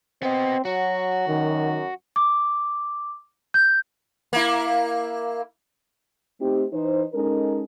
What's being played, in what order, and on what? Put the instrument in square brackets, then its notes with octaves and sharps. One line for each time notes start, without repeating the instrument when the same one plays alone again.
[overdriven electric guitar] B3 D#5 [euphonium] C4
[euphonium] F#3 [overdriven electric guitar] F#4
[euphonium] F#2 [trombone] D#3
[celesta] D6
G6
[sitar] A#3 E4
[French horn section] A3 C4 D#4 G4
E3 D#4 B4 C5
G#3 C#4 D#4 A4 A#4